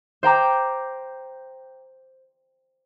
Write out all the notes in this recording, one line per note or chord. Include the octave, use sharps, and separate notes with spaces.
C5 G5 A#5 D6